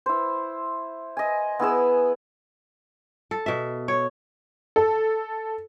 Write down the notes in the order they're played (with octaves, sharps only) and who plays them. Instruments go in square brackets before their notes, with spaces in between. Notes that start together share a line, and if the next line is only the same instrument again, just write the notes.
[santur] E4 C5
D#5 G#5
B3 E4 G#4 E6
[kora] A4
B2 E5
C#5
[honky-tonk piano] A4